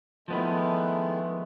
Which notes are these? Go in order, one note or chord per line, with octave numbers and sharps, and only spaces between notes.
D#3 F3 G#3 A3 B3 E4